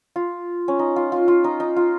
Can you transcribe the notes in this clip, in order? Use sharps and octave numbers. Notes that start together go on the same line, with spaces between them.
F4
C#4
D#4
F4
F4
F4
D#4
D#4
F4